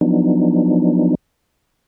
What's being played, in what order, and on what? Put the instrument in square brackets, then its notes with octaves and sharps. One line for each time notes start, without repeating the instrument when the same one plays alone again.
[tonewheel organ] F3 F#3 B3 D4 D#4